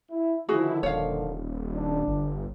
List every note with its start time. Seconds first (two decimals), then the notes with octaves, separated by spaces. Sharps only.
0.11 E4
0.49 D3 D#3 F3 E4 F#4 G#4
0.83 D#1 C#5 F5
1.74 D4
2.08 G1